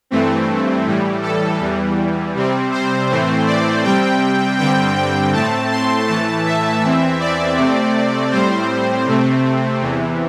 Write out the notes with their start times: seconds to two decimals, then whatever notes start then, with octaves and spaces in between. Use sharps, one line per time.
0.11 G2 E3 A3 C4
0.85 A2 E3 G3
1.22 A4
1.59 E2 E3 G3
2.35 C3 G3 C4
2.72 C5
3.09 A2 E3 A3 C4
3.46 D5
3.83 C3 G3 C4 G5
4.58 G2 D3 G3 C4 G5
4.96 G5
5.33 A2 A3 C4 A5
5.70 C6
6.08 A2 E3 A3 A5
6.45 E5
6.83 E2 E3 C4
7.20 D5
7.57 C3 A3 C4
8.31 A2 G3 C4 C5
9.06 C3 A3 C4
9.81 E2 C3 E3